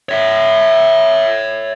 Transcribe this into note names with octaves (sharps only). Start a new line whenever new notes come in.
C#5 E5